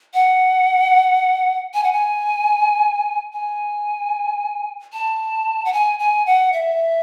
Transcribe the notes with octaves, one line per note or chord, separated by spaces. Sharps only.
F#5
G#5
F#5
G#5
G#5
A5
F#5
G#5
G#5
F#5
E5